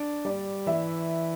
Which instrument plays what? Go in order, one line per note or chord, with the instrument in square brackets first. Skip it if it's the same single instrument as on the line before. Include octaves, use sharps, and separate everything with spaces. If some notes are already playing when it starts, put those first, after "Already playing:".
Already playing: [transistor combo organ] D4
[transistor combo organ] G3 [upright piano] D5
[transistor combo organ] E3 [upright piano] E5